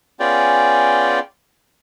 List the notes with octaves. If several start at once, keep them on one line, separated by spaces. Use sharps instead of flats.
B3 C#4 F4 G#4 D5 G5